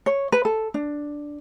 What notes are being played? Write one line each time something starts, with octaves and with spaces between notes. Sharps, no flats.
C#5
B4
A4
D4